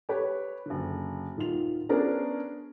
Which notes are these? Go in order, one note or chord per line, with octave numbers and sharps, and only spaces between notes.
G4 B4 C#5
F#1 D3
D#1 D#3 F4 F7
B3 C#4 D4 G#4 A#4 C5